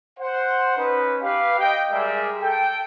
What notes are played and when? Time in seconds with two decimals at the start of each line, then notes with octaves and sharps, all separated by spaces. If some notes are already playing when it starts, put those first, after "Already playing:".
0.20 C5 F#5
0.77 C#4 D#4 B4
1.22 G4 B4 F5
1.59 D#5 G5
1.92 G3 G#3 G#4 A#4 D5 E5
2.41 A4 G5